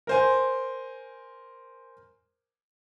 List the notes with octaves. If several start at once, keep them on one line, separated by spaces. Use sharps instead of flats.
A#4 C5 G#5